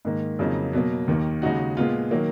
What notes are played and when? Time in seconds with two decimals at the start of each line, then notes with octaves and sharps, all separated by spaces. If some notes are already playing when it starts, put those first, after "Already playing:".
0.05 G#2 D#3 A#3
0.39 F2 C#3 F#3 A#3 D#4
0.73 B2 F#3 A#3
1.08 D#2 D#3 A#3
1.42 D#2 C#3 G#3 D#4 F#4
1.77 A#2 G#3 B3 F4
2.11 D#3 F#3 A#3